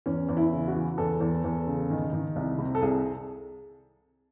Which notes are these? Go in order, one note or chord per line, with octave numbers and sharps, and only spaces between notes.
E2 C#4
E2
E4
C#3
F#4
E3
E2 A4
E2
E2
C#3
D#3
D#3
C2
C3
A4
C2 G#4